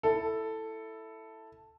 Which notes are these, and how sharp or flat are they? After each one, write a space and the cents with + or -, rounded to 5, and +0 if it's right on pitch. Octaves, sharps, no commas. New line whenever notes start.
E4 +0 A4 +5